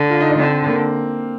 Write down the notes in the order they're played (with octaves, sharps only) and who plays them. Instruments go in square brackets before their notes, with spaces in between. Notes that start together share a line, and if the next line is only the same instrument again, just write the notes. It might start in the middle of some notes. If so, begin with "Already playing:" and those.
Already playing: [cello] D3
[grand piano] F4
D#4
D4
[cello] D3 [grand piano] C4
[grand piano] A#3